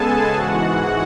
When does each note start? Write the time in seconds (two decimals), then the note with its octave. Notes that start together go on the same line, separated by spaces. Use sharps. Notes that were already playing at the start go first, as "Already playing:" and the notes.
Already playing: C#3 G#3 B3 G#4 A4 G#5 A5
0.32 G#2 E3 G#3 F#4 F#5